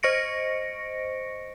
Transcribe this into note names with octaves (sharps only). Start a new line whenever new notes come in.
C5 D#5 C#6 A#6 C#7 D7